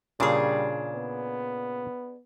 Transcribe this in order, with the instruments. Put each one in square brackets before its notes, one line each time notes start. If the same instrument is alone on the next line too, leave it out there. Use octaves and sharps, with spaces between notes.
[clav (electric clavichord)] A#2 C#3 [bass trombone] G3 [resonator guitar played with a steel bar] D4 G#4
[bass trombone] B3